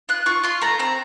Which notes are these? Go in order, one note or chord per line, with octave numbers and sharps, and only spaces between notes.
F4 F#6
F4 C#6
F4 C6
A3 A#5
C4 A#5